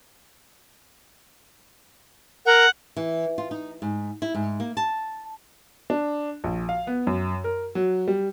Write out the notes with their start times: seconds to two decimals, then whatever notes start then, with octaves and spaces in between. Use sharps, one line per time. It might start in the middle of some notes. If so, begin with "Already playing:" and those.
2.46 A#4 F#5
2.97 E3
3.38 F4
3.51 D#4
3.82 G#2
4.22 E4
4.34 G#2
4.60 A#3
4.77 A5
5.90 D4
6.44 A#1
6.69 F5
6.87 B3
7.07 F#2
7.44 A#4
7.75 F#3
8.08 G3